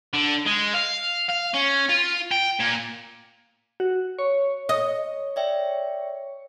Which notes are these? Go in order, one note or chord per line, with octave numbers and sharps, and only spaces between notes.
D3
G#3
F5
F5
C#4
F4
G5
A#2
F#4
C#5
D#5
D5 E5 G5